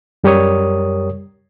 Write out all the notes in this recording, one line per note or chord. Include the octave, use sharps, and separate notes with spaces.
F#2 G3 G4 A#4 C#5 D#6